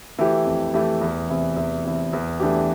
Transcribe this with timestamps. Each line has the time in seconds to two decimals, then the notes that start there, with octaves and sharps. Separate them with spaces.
0.18 E3 A3 E4 G4
0.45 F2
0.74 E3 A3 E4 G4
1.01 E2
1.29 C3 E3
1.56 E2
1.85 C3 E3
2.13 E2
2.40 E3 A3 D4 G4